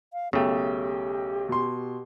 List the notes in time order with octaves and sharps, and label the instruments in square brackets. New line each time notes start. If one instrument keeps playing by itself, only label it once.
[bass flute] F5
[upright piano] B1 G5 [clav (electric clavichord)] C#3 A3 [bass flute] G4
[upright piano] B2 C6